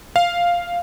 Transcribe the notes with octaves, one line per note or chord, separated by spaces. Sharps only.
F5